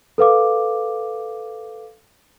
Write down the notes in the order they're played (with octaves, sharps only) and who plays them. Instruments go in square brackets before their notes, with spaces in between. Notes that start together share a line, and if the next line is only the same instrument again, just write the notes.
[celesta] A4 B4 F5 D6